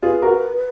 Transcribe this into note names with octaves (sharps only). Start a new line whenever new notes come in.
F4 G#4 B4
F#4 A#4